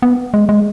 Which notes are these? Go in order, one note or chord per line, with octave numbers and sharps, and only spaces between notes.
B3
G#3
G#3